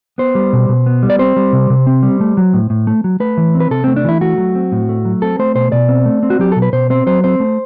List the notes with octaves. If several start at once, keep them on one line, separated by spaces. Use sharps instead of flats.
B3 C5
G3
B2
B2
B3
G3
D5
C4 C5
G3
C3
C3
C4
G3
A3
F#3
A2
A2
A3
F#3
A3 B4
E3
C4
B4
C3 A4
A3 C4
D4
E3 E4
A3 F#4
F#3
C4
A2
A3
F#3
C4 A4
A3 C5
B2 C5
B2 D5
C4
A3
C4
F#4
F#3 G4
B2 A4
B4
B2 C5
C4 C5
F#3 C5
C4 C5
A3